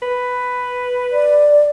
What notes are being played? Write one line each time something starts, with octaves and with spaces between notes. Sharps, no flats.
B4
D5